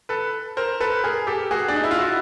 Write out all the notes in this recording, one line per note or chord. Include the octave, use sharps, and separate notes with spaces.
A4 B4
A#4 C5
A4 B4
G#4 A#4
G4 A4
F#4 G#4
D4
D#4
E4
F4
E4 F#4